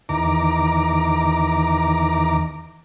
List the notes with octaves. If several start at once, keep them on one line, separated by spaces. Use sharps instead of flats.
E2 D#3 A#5 D6